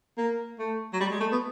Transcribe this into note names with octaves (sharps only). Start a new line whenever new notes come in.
A#3
A3
F#3
G3
G#3
A3
B3